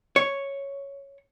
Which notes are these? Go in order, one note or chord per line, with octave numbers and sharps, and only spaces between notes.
C#5